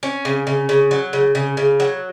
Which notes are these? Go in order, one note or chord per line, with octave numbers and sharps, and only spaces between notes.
C#4
C#3
C#3
C#3
F#3
C#3
C#3
C#3
F#3